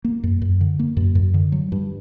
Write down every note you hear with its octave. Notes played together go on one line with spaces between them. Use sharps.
A#3
F#2
F#2
D3
A#3
F#2
F#2
D3
F#3
G2